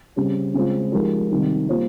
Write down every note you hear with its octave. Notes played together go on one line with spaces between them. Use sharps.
C#3 G3 C4 G4
C#3 G#3 C4 F4
F3 G#3 D#4 G4 A#4
C3 D#3 G3
G3 A#3 F4 C5